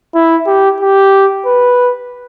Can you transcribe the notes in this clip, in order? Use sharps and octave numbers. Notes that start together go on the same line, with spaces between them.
E4
G4
G4
B4